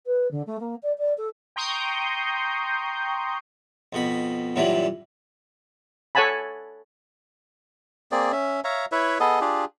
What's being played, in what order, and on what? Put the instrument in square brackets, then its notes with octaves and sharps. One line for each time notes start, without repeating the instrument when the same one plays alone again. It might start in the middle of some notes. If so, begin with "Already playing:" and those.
[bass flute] B4
D3
A3
A#3
D5
D5
A4
[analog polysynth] G5 A#5 C6 C#6 D#6 G6
[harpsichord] F2 B2 B5
F#2 A#2 E3 F#3 G3
[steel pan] A4 C#5 F#5 G#5 A5 B5
[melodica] A#3 C4 G#4 D5
C#4 E5
C#5 E5 F5 A#5
E4 B4 C#5 E5
B3 G#4 A4 D#5
D4 F4 G4 G#4